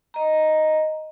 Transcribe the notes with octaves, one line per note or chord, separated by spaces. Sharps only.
D#5 A#5